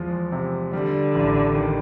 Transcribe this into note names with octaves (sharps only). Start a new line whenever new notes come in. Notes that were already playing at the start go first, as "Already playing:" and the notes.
Already playing: E2 F3 G#3
C3
D3 G3
A1
D#3